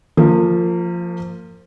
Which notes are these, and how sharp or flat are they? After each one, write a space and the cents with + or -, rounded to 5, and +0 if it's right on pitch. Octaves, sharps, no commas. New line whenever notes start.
F3 +0 A#3 -35